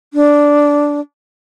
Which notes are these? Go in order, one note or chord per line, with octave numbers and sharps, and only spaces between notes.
D4